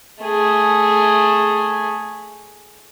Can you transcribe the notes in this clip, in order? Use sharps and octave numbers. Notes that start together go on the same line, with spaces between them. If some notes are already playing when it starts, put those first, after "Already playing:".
A3 G#4